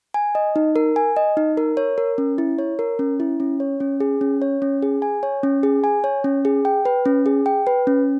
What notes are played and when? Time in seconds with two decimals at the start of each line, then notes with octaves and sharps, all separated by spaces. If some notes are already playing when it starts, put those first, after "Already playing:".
0.14 G#5
0.35 D#5
0.56 D#4
0.76 A#4
0.96 G#5
1.16 D#5
1.37 D#4
1.57 A#4
1.77 C#5
1.98 A#4
2.18 C#4
2.38 E4
2.59 C#5
2.79 A#4
2.99 C#4
3.20 E4
3.40 C#4
3.60 C#5
3.80 C#4
4.00 G#4
4.21 C#4
4.42 C#5
4.62 C#4
4.83 G#4
5.02 G#5
5.23 C#5
5.43 C#4
5.63 G#4
5.84 G#5
6.04 C#5
6.24 C#4
6.45 G#4
6.65 G5
6.85 B4
7.06 C#4
7.26 G#4
7.46 G5
7.67 B4
7.87 C#4